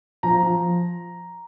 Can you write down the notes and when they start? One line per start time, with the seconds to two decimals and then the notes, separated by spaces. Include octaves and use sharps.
0.23 F3 A#5
0.42 F3